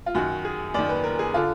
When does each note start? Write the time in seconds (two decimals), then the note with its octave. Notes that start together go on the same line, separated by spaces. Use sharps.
0.06 F4
0.15 F#2 D#3 F#4
0.45 G#4
0.74 F#2 D#3 D5
0.89 B4
1.04 A#4
1.19 G#4
1.34 D3 F4